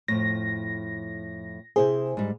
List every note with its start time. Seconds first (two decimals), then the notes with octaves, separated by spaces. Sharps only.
0.08 F2 A2 A#6
1.76 C3 E4 G#4 C5
2.17 G#2 G3